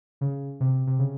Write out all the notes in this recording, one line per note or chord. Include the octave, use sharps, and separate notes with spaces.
C#3
C3
C3
C#3